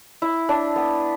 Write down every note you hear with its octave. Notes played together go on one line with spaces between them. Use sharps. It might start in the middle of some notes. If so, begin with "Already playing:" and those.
E4
D4
B3